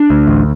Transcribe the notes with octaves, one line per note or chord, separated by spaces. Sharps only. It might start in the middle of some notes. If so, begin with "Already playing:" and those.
Already playing: D4
D2
A1